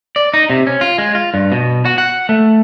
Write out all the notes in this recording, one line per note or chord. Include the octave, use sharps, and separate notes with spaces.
D5
D#4
C3
C#4
F4
G#3
F4
G2
B2
F#4
F#5
A3